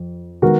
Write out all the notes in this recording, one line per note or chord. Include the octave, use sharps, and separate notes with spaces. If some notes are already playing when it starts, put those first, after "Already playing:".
Already playing: F2
D#3 G#3 B3 F#4 A#4